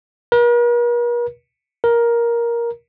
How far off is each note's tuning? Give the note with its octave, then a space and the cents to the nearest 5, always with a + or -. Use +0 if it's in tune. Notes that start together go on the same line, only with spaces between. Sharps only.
A#4 +45
A#4 +10